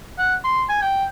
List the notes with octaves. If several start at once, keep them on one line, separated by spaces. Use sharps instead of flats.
F#5
C6
G#5
G5